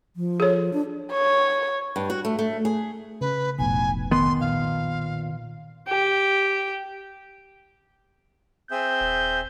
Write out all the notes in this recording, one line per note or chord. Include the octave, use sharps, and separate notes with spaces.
F3
G#4 A4 C#5
D4
C#5
G2
F#4
A3
A3
G#4
C#3 B4
F1 B1 F2 A2 G#5
D#3 B3 C6
A#2 F5
G4
C4 G#4 E5 G6
D#1